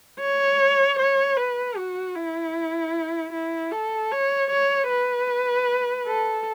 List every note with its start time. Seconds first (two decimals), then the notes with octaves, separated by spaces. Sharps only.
0.21 C#5
0.99 C#5
1.37 B4
1.77 F#4
2.16 E4
3.33 E4
3.72 A4
4.12 C#5
4.51 C#5
4.89 B4
6.06 A4